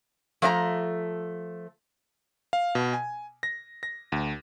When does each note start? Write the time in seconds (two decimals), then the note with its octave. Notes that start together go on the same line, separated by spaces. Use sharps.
0.42 F3 A3 D5 A#5
2.53 F5
2.75 B2
2.93 G#5
3.43 A#6
3.83 A#6
4.12 D2